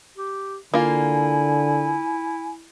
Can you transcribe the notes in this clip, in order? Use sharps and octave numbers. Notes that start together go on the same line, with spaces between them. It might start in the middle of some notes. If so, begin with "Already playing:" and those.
G4
D3 A#3 E4 F4 G#5